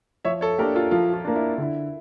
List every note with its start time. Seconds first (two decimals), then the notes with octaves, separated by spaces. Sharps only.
0.25 F3 C#5 E5
0.41 A4 C#5
0.58 A#3 D4 G4 A#4
0.75 F4 A4
0.91 F3 F4
1.13 F4
1.25 A#3 D4
1.35 E4
1.58 D3 E4